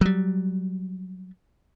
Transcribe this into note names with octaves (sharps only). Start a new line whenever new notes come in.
F#3 G3